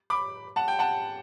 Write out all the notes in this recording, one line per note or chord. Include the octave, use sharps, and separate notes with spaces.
B5 D6
F#5 A5
G5
F#5 A5